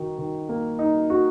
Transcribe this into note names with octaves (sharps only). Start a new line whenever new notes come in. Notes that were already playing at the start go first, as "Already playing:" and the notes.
Already playing: D#3 D#4 F#4
D#3
A#3
D#4
F#4